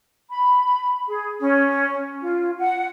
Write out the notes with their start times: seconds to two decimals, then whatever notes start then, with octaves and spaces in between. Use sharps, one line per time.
0.30 B5
1.08 G#4
1.40 C#4
2.22 F4
2.59 F#5